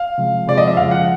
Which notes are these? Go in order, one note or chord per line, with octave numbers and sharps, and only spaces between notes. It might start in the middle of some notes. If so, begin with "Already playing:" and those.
Already playing: F5
C3 F3 G#3
C3 F3 G#3 D5
D#5
E5
F2 C#3 F3 G#3 F5
F#5